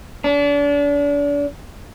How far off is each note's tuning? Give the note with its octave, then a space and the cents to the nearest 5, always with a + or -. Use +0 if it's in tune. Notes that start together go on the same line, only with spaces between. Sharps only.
D4 -35